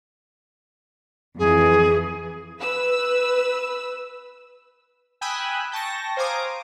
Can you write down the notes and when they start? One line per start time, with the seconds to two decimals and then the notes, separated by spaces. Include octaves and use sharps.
1.39 F2 E3 G#4
2.59 B4 E6
5.21 G5 G#5 B5 D#6 E6 F#6
5.72 G5 A5 C#6 A#6
6.17 C5 F5 G#5 A#5 D6 D#6